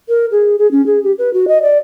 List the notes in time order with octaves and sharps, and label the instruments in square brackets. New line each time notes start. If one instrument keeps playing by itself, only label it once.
[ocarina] A#4
G#4
G#4
C#4
G#4
G4
B4
F#4
D#5
D5